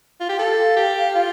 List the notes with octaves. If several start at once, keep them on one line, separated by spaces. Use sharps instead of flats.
F4
G4
A4 F5
G4
F4